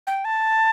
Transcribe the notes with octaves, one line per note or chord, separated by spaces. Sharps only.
G5
A5